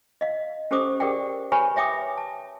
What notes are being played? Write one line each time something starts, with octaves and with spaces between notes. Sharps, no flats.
D#5 F5
C#4 G4 A4 C5 D6 D#6
G4 G#4 A#4 D5 F#5 G5
G4 B4 C#5 G#5 B5 C#6
C#5 E5 G5 D6 D#6
A5